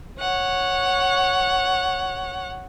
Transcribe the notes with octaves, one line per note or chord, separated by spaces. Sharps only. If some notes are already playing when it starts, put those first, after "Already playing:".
C#5 F#5